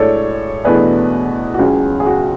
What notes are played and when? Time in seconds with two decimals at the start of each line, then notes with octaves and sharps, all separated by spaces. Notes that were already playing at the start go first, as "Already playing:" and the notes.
Already playing: A2 G#3 D4 A4 C#5 D5
0.64 E2 B2 A3 D4 G#4 B4
1.54 F#4
1.59 C#2 C#3 F#3 C#4 G#4
2.00 G#4
2.06 F#4